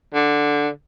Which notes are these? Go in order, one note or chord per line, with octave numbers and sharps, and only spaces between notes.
D3